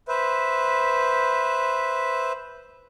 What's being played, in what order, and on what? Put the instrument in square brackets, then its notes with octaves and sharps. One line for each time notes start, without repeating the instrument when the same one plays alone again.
[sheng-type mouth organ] B4 C5 E5